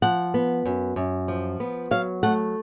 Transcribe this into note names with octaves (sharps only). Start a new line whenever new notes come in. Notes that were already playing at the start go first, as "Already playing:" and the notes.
F3 F#5
B3
F#2
F#2
F3
B3
F#3 F5
A3 F#5